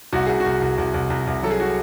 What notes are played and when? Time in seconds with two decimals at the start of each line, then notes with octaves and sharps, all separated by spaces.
0.13 C2 F#4
0.26 C2 G#4
0.40 F#4
0.46 C2
0.61 C2
0.78 C2
0.94 C2
1.10 C2
1.27 C2
1.43 F#3 A4
1.51 G#4
1.60 F#4